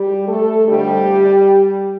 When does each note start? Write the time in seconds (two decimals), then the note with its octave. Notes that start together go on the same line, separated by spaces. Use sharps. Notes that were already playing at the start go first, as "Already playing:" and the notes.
Already playing: G3 G4
0.28 A3 A4
0.67 F2 D3 G3 A3 G4